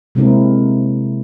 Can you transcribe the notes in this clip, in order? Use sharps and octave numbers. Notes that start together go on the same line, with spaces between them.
C3 G#3 A#3 C4 E4 A#4